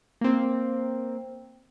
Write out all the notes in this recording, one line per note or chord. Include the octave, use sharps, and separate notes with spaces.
A#3 C4